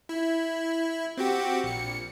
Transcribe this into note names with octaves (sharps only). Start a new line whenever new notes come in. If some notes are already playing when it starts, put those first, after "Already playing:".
E4
C4 F#4 G4
A#1 C#7